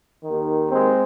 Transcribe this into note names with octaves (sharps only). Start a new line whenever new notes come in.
D#2 D#3
G#3 C4